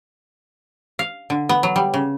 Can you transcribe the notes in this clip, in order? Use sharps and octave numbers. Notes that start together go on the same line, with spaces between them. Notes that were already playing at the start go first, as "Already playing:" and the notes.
F5
D3
B3
F#3
G3
C#3